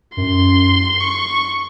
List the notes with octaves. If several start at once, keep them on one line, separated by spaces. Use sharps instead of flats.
F#2 C6
C#6